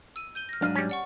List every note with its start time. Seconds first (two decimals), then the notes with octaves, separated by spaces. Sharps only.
0.16 E6 D#7
0.35 G6 D#7 G7
0.49 F6 A#6
0.62 G#2 F#3 D4 F5 F6 D#7
0.76 G3 C#4
0.90 D5 F#5 C#6